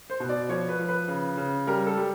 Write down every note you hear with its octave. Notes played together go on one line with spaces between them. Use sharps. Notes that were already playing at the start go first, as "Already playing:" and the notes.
C5
B2
D5
F3 C#5
B4
F3
B4
C#3
C#3
G3 A#4
A4
G3